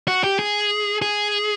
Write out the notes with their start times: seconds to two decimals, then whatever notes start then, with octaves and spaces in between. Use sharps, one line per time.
0.08 F#4
0.24 G4
0.39 G#4
1.02 G#4